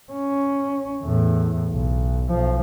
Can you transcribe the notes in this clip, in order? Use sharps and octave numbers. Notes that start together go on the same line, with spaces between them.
C#4
E2 A2
B1
B1 F3